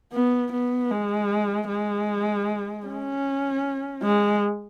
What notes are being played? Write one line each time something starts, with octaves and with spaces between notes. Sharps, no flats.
B3
B3
G#3
G#3
C#4
G#3